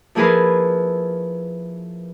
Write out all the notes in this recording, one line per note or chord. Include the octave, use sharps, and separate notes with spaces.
F3 A#3 E4 G#4 A#4 B4